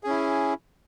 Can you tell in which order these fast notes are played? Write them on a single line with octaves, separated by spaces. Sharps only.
G#4 C#4 E4